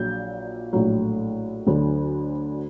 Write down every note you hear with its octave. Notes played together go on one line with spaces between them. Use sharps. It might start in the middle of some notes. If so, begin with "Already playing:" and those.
Already playing: A#1 A#2 F#3 G6
A#1 A2 F#3
D2 D3 F#3